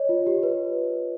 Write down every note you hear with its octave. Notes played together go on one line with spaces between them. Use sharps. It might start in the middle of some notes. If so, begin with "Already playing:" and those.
Already playing: C#5 D#5
F4
G4
B4